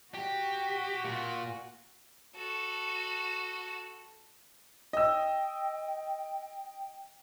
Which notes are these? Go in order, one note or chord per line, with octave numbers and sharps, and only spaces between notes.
F#4 G4
A#2
F#4 A4
D#5 G5 E6